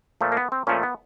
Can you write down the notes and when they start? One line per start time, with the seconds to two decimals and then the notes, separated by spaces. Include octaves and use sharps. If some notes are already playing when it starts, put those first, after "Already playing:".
0.21 A#2 F3 A3
0.32 A#3
0.37 B3
0.52 C4
0.67 A#2 F3 A3 C#4
0.83 B3